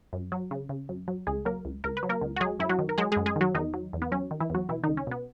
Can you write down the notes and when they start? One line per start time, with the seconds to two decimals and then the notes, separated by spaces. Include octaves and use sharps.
0.13 F#2
0.32 F#3
0.51 C#3
0.69 C#3
0.89 F#2
1.08 F#3
1.27 C#2 G#3 G#4
1.45 F#3 A#3 A#4
1.65 C#2
1.84 C#2 A#4
1.97 B4
2.03 F#3
2.09 A#3 A#4
2.21 C#2
2.36 F#4
2.40 F#3 G#3 G#4
2.59 F#2 E4
2.69 F#3 F#4
2.79 D#3
2.89 A#4
2.98 F#3 G#3 G#4
3.12 F#2 G#3 G#4
3.26 G#3 G#4
3.36 D#3 F#3 F#4
3.55 E2 D#3 D#4
3.74 F#3
3.93 E2
4.02 B3
4.12 F#3 C#4
4.31 D#3
4.40 E3 E4
4.50 E2 F#3 F#4
4.69 B2 E3 E4
4.84 C#2 D#3 D#4
4.97 C#4
5.07 B2 B3